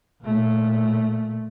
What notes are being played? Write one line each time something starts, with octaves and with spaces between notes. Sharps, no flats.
A#2 A3